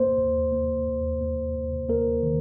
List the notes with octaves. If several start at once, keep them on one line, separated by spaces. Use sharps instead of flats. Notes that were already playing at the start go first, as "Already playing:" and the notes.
Already playing: A#3 C5
D#2
A#3
D#2
A#3
D#2
A#3 A#4
D#3